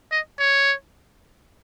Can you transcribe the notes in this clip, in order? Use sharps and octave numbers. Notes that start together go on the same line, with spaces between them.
D#5
C#5